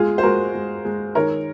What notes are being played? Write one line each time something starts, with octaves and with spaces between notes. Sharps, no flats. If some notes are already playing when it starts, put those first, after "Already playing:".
Already playing: G#3 F4 G#4
C5
G#3 F#4 A#4
G#3
G#3
D#3 A#4 C#5